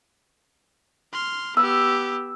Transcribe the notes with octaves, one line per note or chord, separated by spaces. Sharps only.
C6 F6
B3 G4 E6